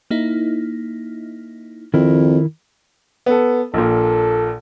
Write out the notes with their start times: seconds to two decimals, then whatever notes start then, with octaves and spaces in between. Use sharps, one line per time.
0.11 A#3 D#4 E4
1.94 F2 D#3 E4 A#4
3.26 B3 A4
3.74 A#1 A#2 A4